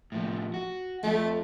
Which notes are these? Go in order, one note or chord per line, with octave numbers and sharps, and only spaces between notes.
A2 F3
F#4
F2 F3 A3